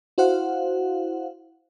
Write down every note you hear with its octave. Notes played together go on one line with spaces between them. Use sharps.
E4 F#4 C5 F5 F#5